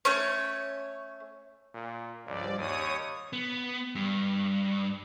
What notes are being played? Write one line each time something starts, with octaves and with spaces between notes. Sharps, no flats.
A3 C#4 C#5
A#2
C#2 G2 F3 D5
D#2 C#5 D#6
B3
G2